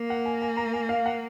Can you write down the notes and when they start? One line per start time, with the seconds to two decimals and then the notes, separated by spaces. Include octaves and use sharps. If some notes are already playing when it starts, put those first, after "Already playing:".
Already playing: A#3
0.10 F#5
0.26 G#5
0.42 G#5
0.57 A#5
0.73 G#5
0.89 F5
1.06 F#5